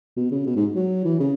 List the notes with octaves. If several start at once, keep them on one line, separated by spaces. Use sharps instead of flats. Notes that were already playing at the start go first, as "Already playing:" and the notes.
B2
C#3
B2
G#2
F#3
E3
C#3